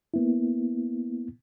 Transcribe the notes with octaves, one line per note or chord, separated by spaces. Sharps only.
A#3 B3 E4